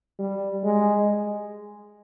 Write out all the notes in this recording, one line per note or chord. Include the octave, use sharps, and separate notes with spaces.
G3
G#3